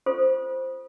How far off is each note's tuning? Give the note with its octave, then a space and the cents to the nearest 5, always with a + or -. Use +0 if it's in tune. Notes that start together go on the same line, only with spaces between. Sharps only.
F4 +0 A4 +15 C5 +0